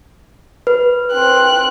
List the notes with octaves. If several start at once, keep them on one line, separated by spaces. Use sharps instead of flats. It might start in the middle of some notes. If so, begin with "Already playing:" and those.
B4
C4 F#6